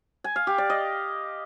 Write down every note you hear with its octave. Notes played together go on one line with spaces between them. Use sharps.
G#5
F5
G4
D5
D#5